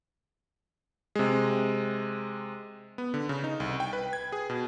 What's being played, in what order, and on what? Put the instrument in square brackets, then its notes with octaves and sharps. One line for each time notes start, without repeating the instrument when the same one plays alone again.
[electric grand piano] C3 G#3
B3
D3
C#3
D#4
C2
G5
B4
G#6
G#4
B2